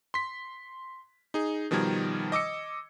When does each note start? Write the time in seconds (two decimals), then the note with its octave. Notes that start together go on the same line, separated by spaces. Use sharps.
0.14 C6 B6
1.34 D#4 G#4
1.71 B2 D#3 F3 G3 A#4 G#6
2.32 D#5 D6 E6 C#7